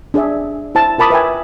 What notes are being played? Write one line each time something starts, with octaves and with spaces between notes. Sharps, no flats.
D4 G#4 D5 E5
E4 C5 A5
F4 A#4 A5 B5 D6 D#6
B4 E5 G5 G#5